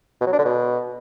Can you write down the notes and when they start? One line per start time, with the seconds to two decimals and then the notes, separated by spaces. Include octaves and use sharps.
0.20 B2
0.27 F#3
0.33 D4
0.39 D3
0.45 B2